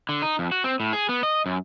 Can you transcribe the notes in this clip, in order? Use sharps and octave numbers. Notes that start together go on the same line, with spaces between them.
D3
D#4
F2
F#4
C4
A2
G#4
B3
D#5
F#2